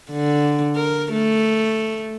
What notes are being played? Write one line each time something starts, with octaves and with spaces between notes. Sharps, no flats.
D3
A#4
A3